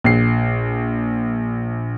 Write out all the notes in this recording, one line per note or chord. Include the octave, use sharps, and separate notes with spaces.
A#1 C7